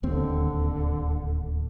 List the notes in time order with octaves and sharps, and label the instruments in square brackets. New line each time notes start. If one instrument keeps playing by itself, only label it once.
[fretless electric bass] D1 D#2 C4 [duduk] D3